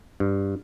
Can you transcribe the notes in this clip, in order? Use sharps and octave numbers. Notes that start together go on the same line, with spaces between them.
G2